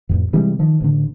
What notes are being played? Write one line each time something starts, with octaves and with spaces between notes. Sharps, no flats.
A1 F2
C3 E3 G3 G#3
D#3 F3
A1 D3